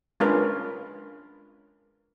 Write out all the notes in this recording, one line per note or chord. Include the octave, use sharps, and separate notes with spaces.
G#3 C#4 D4 F4 A#4 B4